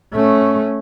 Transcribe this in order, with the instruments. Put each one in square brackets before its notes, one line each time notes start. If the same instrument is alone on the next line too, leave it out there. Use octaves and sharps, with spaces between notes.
[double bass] A3 C#4